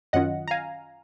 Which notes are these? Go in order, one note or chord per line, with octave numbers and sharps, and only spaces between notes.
F#2 D#3 F#3 C#4 F4 D#5 F#5
A#5
F5 G#5